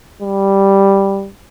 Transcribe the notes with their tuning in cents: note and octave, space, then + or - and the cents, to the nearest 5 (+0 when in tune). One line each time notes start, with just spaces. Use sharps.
G3 +0